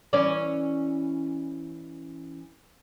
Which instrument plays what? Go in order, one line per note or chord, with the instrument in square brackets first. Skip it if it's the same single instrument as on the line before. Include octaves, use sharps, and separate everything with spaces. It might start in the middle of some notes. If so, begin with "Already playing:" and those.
[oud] E3 C#4 D5